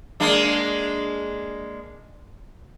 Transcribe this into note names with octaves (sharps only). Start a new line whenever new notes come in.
G#3 A#3 D4